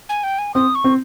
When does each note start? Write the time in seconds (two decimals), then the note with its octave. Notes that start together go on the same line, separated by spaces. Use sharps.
0.09 G#5
0.24 G5
0.39 G#5
0.54 C4 D#6
0.75 C#6
0.84 C4